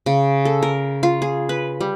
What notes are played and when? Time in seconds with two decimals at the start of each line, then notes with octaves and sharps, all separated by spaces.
0.06 C#3
0.45 A4
0.63 A#4
1.03 F4
1.22 G#4
1.49 B4
1.81 G3